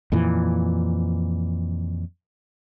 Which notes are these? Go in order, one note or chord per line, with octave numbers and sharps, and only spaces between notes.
F2 A#2 E3